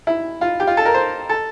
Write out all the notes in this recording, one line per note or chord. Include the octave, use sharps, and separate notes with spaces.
E4
F4
G4
F4
A4
A#4
C5
A4